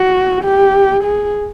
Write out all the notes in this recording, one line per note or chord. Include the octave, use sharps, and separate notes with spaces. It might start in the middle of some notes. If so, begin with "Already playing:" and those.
Already playing: F#4
G4
G#4